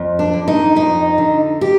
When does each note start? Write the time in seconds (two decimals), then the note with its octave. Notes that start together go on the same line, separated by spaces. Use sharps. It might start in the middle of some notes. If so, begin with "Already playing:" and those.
Already playing: F2
0.19 D4
0.34 D3
0.48 D#4
0.76 F2 D#4
1.18 D3
1.61 G4